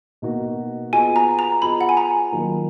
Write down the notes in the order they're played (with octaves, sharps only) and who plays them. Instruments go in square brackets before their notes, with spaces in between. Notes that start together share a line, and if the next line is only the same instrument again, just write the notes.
[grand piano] B2 A#3 D#4 F#4
[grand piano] B3 F4 G#4 D#5 [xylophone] G#5
[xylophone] A#5
A#5
[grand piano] B3 F4 G#4 D#5 [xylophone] B5
[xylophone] F#5
G#5
A#5
[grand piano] D#3 F#3 A#3 F4 A#4